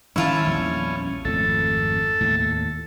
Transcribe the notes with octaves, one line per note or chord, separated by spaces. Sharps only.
D#3 E3 G#3 C#4 E4 F4 A5
A#1 E2 G3
G#1 F2 A3 A4
D#2 A2